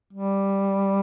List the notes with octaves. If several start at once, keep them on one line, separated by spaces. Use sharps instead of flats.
G3